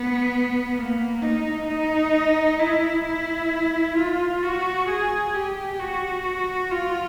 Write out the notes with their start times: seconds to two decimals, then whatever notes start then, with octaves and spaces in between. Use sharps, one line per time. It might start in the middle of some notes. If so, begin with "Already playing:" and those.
Already playing: B3
0.76 A#3
1.22 D#4
1.68 D#4
2.59 E4
3.05 E4
3.97 F4
4.43 F#4
4.88 G#4
5.34 G4
5.79 F#4
6.71 F4